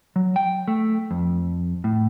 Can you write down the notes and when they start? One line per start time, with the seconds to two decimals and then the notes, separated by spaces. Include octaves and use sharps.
0.16 F#3
0.36 G5
0.68 A3
1.11 F2
1.84 A2